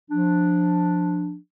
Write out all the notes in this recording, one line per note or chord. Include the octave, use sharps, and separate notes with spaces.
F3 D4